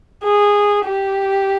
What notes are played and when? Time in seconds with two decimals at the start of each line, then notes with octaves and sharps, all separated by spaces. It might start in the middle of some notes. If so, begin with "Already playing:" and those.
0.23 G#4
0.85 G4